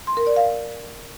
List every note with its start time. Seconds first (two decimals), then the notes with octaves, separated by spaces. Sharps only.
0.07 C6
0.17 A#4
0.27 D5
0.36 F5